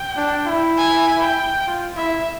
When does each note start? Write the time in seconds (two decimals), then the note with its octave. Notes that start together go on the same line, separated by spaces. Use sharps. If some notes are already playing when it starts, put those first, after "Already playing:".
Already playing: G5
0.17 D4
0.47 E4
0.77 G#5
1.22 G5
1.68 F4
1.96 E4 E5